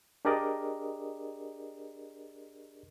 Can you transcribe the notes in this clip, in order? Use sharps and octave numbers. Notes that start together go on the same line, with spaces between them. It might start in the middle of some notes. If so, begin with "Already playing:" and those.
D4 G4 G#4 A#4 D5 D#5